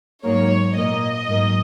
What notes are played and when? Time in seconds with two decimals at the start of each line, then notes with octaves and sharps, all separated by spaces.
0.24 G#2 F#3 A#3 C#5
0.75 A#2 A#3 D#5
1.27 G#2 F#3 A#3